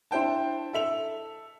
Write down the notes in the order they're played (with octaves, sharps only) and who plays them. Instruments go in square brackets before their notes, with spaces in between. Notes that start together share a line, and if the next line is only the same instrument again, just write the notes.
[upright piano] D4 E4 C5 G5 A5
A4 E5 F7